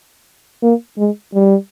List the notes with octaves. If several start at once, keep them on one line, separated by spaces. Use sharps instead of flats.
A#3
G#3
G3